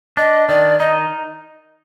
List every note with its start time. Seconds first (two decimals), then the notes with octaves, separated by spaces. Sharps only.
0.17 D4 D#5
0.48 D#3 D5
0.79 D#4 D#5